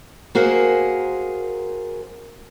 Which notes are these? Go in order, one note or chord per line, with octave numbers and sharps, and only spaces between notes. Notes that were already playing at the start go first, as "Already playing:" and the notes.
A#3 F#4 G#4 A#4 C5